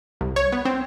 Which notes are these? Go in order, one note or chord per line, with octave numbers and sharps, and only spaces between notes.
C2
C#5
B3
C4